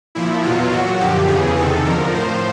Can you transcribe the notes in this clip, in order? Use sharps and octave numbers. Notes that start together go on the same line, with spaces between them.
A#2 F3 E4
E2 B2 F#3 F4
A#2 F#3 F#4
F#2 D3 F3 G4
E2 C#3 E3 G#4
E2 C3 D#3 A4
F2 D3 F3 A#4
A2 F3 C5